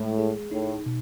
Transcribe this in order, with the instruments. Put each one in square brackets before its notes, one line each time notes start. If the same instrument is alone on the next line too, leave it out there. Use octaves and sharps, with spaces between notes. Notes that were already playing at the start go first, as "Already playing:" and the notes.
Already playing: [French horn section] A2 [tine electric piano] G#3
[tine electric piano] G#4
[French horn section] A2 [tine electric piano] D#4
[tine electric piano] B2